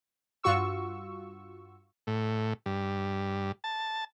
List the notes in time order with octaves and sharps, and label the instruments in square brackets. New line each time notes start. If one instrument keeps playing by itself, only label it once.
[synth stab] G2 F4 F#4 C#6 E6
[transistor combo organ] A2
G2
A5